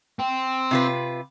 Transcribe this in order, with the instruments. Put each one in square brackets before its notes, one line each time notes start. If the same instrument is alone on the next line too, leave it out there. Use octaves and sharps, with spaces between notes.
[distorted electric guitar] C4
[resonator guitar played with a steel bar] C3 F4 B4